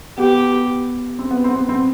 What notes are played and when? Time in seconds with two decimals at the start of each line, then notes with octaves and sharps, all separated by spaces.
0.18 B3 G4
1.19 C4
1.31 B3
1.44 C4
1.56 B3
1.69 C4